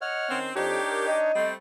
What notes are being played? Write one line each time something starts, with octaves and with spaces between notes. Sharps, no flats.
C#5 D#5 F#5 F6
D#3 C4 C#4
F2 D4 D#4 G4 C#5
A#4
D#5
G3 A3 C4 C5